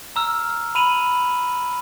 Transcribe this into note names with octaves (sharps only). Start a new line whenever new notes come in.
A#5 E6 F6
B5 D#7 F7 F#7